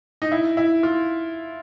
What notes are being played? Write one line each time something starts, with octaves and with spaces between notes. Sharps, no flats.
D#4
E4
E4
F4